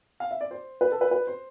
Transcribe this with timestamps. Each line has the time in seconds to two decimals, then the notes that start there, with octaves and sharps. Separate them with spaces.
0.20 F5
0.31 E5
0.41 D5
0.51 C5
0.81 B4
0.92 A4
1.01 B4
1.11 B4
1.27 C5